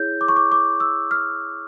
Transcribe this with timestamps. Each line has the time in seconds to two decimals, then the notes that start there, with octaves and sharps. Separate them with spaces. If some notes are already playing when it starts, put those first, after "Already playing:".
Already playing: E4 G#4 C#5 G6
0.21 D6
0.28 C#6
0.36 D6
0.52 D6
0.80 E6
1.11 F6